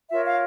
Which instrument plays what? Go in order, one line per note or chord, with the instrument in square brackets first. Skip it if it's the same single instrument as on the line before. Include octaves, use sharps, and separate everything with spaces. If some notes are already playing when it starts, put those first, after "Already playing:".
[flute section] F4 A#4 C#5 E5
F5